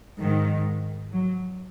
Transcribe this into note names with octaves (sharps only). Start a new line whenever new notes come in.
G#2 D#3
F#3